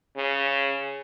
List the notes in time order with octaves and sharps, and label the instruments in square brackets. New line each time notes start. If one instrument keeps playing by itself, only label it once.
[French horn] C#3